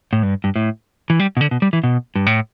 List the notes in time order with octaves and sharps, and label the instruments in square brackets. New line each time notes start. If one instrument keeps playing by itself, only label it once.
[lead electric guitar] A2
G2
G2
A2
E3
G3
B2
D3
B2
G3
E3
B2
G2
A2